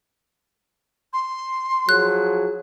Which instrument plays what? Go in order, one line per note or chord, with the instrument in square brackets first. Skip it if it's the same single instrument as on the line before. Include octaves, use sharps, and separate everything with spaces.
[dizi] C6
[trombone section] F3 F#3 G#4 [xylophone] F#6